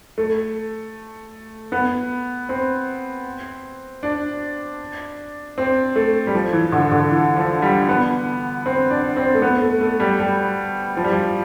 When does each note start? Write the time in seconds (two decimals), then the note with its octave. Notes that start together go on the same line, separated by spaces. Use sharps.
0.18 A3
1.72 B3
2.49 C4
4.03 D4
5.58 C4
5.96 A3
6.27 G3
6.34 F3
6.53 E3
6.72 D3
6.91 D3
7.11 E3
7.36 F3
7.62 G3
7.89 B3
8.66 C4
8.90 D4
9.17 C4
9.34 A3
9.42 B3
9.61 A3
9.81 A3
10.00 G3
10.20 G3
10.97 F3
11.04 G3
11.12 F3